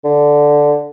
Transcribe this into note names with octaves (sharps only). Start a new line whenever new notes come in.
D3